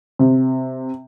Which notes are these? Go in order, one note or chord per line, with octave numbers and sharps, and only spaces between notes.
C3